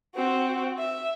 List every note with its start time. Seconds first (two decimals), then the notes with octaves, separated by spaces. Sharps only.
0.15 C4 F#4
0.78 E5